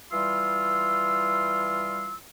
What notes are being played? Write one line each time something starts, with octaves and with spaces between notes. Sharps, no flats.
E3 G3 F4 C6 E6